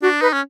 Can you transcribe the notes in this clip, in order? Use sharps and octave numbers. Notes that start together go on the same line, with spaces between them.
D4 F#4
D#4 B4
C#4